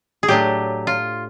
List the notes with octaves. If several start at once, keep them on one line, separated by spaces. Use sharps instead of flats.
G#4
A2 F#3 A3 D4 G4
F4